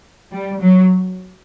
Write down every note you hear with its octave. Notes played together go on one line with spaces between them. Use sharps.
G3
F#3